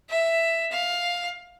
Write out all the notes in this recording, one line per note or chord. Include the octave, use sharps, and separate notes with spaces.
E5
F5